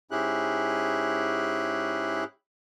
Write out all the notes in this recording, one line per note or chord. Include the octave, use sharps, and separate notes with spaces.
G#2 C#4 E4 G4 G#4 F#6